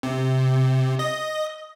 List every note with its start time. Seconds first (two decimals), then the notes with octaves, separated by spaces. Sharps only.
0.03 C3
0.99 D#5